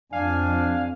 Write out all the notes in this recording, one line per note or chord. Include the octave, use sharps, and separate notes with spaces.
F2 D4 F5 G#5